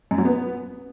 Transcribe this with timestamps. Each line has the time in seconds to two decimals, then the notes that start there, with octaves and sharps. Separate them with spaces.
0.11 F#2
0.18 F#3
0.25 B3